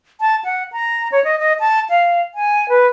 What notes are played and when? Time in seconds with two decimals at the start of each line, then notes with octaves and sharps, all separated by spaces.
0.21 A5
0.45 F#5
0.72 A#5
1.12 C#5
1.24 D#5
1.39 D#5
1.60 A5
1.90 F5
2.35 G#5
2.69 B4